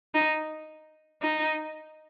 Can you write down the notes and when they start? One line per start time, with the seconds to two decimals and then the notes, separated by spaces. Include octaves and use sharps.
0.14 D#4
1.22 D#4